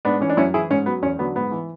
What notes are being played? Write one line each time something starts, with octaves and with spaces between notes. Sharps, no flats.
G#2 B3 D4
E3 C#4
D4
F#2 C#4 E4
E3 E4 G#4
G#2 C#4
F#3 B3
E2 C#4
D3 F#3 B3
G#2 B3
E3